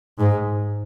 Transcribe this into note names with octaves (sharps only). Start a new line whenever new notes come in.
G#2